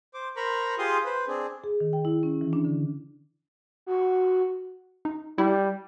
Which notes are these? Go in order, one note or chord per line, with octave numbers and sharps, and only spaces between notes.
C5 D6
A#4 C5 A#5 B5 C#6
F4 G4 G#4 F5 C6 D#6
B4 C5
C4 D4 G#4
G#4
D#3
G5
E4
C#4
E3
D4
D3
F#4
D#4
G3 E4